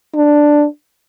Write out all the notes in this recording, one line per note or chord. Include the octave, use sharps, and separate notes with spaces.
D4